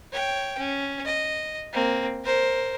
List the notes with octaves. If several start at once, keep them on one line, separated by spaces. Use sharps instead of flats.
C#5 G5
C#4
D#5
A#3 C4
A#4 C5